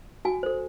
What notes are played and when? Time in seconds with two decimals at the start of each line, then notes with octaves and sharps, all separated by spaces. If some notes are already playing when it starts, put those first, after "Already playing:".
0.25 F#4 G#5
0.43 A4 C5